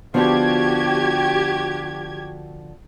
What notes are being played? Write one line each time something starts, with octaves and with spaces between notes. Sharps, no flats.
D3 F3 B3 F#4 G4 G#6